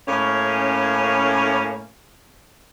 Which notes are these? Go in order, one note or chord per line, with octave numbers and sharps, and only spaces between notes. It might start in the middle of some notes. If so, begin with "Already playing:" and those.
A2 A#3 C#4